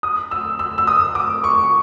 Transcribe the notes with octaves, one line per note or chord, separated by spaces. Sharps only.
D#6
E6
E6
E6
D#6
D6
C#6
C#6